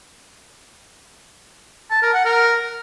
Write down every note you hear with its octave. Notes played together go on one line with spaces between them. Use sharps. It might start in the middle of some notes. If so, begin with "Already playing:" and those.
A5
A#4
F#5
A#4